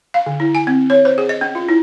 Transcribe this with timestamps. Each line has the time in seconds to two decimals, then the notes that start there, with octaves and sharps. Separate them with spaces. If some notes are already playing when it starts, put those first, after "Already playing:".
0.14 F5
0.26 D3
0.40 E4
0.55 G#5
0.67 C4
0.90 C#5
1.05 C5
1.18 G#4
1.29 D#5
1.41 C#4
1.55 F4
1.69 E4